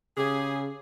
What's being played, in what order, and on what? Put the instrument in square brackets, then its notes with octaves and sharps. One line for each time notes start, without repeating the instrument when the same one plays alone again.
[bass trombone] C#3 [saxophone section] C#4 G4 G#4